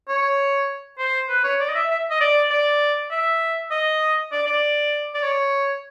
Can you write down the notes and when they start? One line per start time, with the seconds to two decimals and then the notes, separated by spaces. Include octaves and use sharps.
0.09 C#5
0.98 C5
1.29 B4
1.44 C#5
1.60 D5
1.69 D#5
1.75 E5
1.90 E5
2.10 D#5
2.21 D5
2.51 D5
3.11 E5
3.71 D#5
4.32 D5
4.47 D5
5.14 D5
5.23 C#5